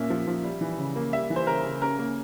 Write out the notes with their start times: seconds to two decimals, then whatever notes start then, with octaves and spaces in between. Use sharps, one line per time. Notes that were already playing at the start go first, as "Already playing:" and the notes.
Already playing: A#2 A#3 C#4 E5
0.10 F3
0.27 F3
0.44 G3
0.61 E3
0.78 C#3
0.96 A#3
1.13 G3 E5
1.30 E3
1.36 C5
1.47 C#3 A#4
1.64 C#3
1.82 C#4 A#4
1.99 A#3